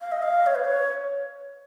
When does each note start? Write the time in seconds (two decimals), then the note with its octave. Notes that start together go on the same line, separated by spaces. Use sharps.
0.01 F5
0.12 D#5
0.22 F5
0.46 C#5
0.55 B4
0.65 C#5